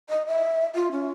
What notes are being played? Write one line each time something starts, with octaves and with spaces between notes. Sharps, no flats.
D#5
E5
F4
C#4